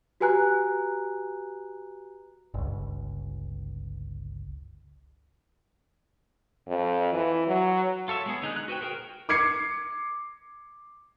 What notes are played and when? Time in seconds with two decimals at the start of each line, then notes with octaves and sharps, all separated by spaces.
0.21 F#4 G4 B4 G#5 A#5 F#6
2.54 G1 C#2
6.68 F2
7.13 E3
7.48 F#3
8.08 F4 A4 C#5 E5
8.26 G#3 B3 G#4
8.42 D3 D#4 G#4 F#6
8.56 F#6
8.68 F#4 B4 C5 G5
8.81 F#4 G#4 A#4 C5 G5
9.29 D6 G#6 C7 C#7